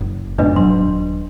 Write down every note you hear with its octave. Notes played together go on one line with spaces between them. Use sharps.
F#1
F2 G#2 B2 D4 B4 D#5
D#1 F#3 C6